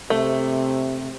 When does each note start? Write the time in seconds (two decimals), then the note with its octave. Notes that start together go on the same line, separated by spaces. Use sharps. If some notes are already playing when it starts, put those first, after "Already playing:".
0.10 C3 A3